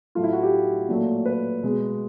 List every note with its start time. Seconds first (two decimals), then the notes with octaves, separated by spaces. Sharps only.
0.15 A2 F#3 A3 F4
0.24 E4
0.33 F#4
0.43 G4
0.89 A#2 F#3 A3
1.26 B4
1.63 B2 G#3